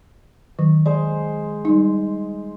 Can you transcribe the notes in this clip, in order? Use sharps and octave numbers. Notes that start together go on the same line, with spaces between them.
D#3 F#3
G#3 C5 D5
G3 D#4